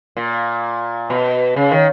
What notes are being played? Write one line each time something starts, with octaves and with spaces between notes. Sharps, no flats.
A#2
B2
C#3
D#3